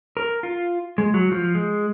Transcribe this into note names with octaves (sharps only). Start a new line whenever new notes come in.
A#4
F4
G#3
F#3
F3
G#3